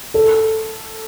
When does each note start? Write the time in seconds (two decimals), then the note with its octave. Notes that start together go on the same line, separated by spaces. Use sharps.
0.14 A4